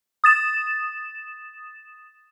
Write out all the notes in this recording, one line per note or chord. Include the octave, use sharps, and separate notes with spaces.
D#6 A6 E7